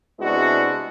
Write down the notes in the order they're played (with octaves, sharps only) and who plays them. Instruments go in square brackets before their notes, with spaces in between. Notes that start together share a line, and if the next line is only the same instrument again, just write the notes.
[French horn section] C3 G#3 B3 D4 E4 F#4